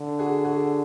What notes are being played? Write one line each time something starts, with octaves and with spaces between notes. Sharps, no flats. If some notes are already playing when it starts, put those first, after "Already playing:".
Already playing: D3
F#4 G#4
F#4 G#4